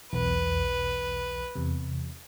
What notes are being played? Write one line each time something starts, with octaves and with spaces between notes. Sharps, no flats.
B1 E2 B4
E2 C3